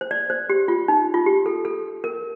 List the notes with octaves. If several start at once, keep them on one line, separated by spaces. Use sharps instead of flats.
C5
D5
C5
G4
F4
D#4
F4
G4
A4
A4
A#4